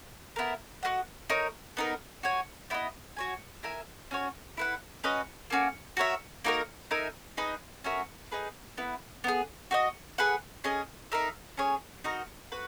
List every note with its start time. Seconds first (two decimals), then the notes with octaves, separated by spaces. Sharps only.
0.36 B3 E4 A#4
0.83 F#4 B4 D#5 F#5
1.30 D#4 A#4 C#5
1.77 B3 D#4 A#4
2.23 F#4 C#5 G#5
2.70 B3 E4 B4 D#5
3.17 F#4 C#5 G#5
3.63 E4 A#4 E5 G#5
4.11 C#4 F#4 C#5
4.57 E4 B4 F#5
5.04 C#4 F#4 B4 D#5
5.50 A#3 C#4 F#4
5.97 F#4 A#4 C#5 E5
6.44 A#3 D#4 F#4 A#4
6.91 D#4 A#4 E5 G#5
7.37 D#4 G#4 B4 D#5
7.84 C#4 F#4 A#4 E5
8.32 D#4 G#4 B4
8.78 B3 E4 B4
9.24 B3 D#4 G#4
9.71 F#4 B4 D#5
10.18 G#4 B4 F#5
10.64 C#4 G#4 D#5
11.12 D#4 A#4 E5
11.57 C#4 G#4 C#5
12.04 D#4 F#4 A#4 D#5
12.52 F#4 B4